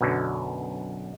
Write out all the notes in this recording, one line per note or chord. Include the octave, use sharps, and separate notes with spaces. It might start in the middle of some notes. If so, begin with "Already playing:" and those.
B1 F#2 B2 D3